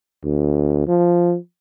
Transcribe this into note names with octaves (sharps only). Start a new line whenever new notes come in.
D2
F3